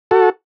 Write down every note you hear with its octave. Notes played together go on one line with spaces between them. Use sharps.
F#4 A4